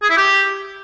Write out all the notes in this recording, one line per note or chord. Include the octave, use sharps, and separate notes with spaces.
G#4
E4
G4